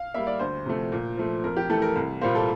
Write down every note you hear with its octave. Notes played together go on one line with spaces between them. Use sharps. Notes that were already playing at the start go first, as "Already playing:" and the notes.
Already playing: F5
G3 A#3 E5
D5
D2 C5
C3 F3 A3
A#2
F3 A3
F2 A#4
G4
E3 A3 A4
A#4
C2
A#2 G3 A#3 C5
A4